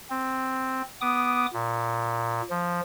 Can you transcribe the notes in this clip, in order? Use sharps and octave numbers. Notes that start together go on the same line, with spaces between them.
C4
B3 D6 D#6
A#2
F3